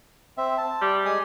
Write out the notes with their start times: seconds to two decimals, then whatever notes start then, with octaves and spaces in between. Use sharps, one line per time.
0.38 C4 E5
0.58 A5
0.82 G3
1.05 G#3 G#5 D#6